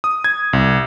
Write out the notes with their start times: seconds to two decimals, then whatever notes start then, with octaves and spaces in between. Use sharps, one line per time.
0.04 D#6
0.24 G#6
0.53 C2